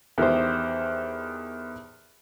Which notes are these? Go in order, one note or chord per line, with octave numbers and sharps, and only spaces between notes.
E2 D#3 G4 C5